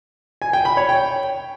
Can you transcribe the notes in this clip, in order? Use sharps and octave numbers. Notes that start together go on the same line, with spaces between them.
G#5
G5
B5
C#5
G5